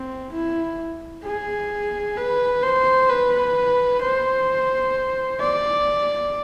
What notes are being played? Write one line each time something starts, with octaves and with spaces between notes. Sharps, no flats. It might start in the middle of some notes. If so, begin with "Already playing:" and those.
Already playing: C4
E4
G#4
B4
C5
B4
C5
D5